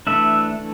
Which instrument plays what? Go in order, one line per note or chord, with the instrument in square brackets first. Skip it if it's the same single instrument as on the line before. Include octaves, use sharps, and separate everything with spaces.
[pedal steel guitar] E3 A3 D4 E5